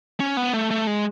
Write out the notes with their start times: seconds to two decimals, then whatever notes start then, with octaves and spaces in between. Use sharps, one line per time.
0.20 C#4
0.37 B3
0.54 A3
0.71 A3
0.87 G#3